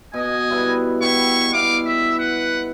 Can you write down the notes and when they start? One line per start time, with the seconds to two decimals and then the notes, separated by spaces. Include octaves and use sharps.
0.14 B2 D#5 G#5
0.50 G3 E4 B4
1.01 B3 E4 G5 C#6
1.53 B3 E4 F5 D6
1.85 E5
2.18 B4 F#5